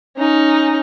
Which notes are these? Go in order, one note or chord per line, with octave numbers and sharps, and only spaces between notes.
C#4 D#4